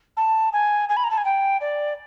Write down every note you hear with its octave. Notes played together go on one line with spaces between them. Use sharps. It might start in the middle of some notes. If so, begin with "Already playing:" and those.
A5
G#5
G#5
B5
A#5
A5
G#5
G5
D5